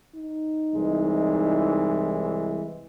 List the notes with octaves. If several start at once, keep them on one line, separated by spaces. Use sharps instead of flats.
D#4
C2 E3 G#3